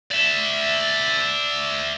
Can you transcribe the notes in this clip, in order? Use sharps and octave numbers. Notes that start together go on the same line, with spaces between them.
D5 E5